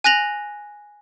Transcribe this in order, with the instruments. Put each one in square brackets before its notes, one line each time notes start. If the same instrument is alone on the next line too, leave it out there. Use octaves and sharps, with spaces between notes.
[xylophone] G#5 F#6 A#6 F7 F#7